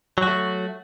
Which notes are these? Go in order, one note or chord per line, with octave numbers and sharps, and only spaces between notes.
F#3 A3 F#4